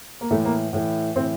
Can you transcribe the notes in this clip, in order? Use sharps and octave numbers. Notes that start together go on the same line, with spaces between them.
A#3
A2 E3 A3
A#3
A2 E3
A2 E3 C4